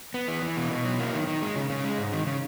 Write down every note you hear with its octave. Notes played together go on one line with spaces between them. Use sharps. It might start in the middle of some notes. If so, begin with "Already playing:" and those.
B3
E3
E3
B2
B2
F#3
A#3
D#3
D#3
G#3
C#3
C#3
G#3
G#2
D#3
C#3